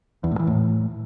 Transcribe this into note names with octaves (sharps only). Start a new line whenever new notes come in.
E2
A2
E3
A2